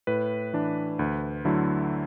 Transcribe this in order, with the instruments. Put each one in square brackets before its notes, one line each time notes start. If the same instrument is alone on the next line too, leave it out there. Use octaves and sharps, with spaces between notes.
[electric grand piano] A2 B4
E3 D4
D2
D3 F#3 A3 E4